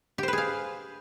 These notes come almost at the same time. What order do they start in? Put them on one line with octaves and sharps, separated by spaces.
G4 C5 B4 G#4 F5